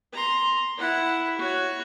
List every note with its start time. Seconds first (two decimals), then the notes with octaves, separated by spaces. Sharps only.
0.14 A#5 C6
0.78 E4 F#5
1.39 F#4 C#5